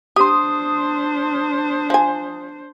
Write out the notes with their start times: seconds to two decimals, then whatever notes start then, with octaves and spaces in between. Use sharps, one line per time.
0.16 D4 G4 C5 C6 D#6
1.90 F3 G#5